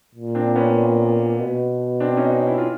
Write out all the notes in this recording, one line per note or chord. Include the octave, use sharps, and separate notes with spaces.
A#2
C4 D4
B3 C#4
B2
C4 D4
C#4 D#4
C#4 D#4
E4
F4